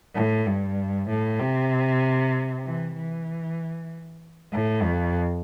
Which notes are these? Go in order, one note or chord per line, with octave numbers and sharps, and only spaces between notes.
A2
G2
A2
C3
E3
E3
A2
F2